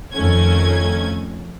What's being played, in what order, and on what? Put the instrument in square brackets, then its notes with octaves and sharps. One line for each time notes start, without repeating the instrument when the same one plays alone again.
[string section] F2 D#3 A3 C#4 G#6